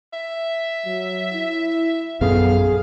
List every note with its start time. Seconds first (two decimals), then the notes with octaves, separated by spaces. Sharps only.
0.13 E5
0.86 F#3
1.33 E4
2.21 A#1 F#2 B3 G#4 A4 F5